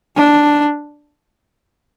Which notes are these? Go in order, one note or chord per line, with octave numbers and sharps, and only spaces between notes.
D4